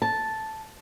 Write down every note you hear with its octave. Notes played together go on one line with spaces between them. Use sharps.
A5